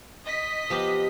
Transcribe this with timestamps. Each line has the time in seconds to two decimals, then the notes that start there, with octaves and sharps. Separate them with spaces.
0.24 D#5 B6
0.70 F3 B3 G4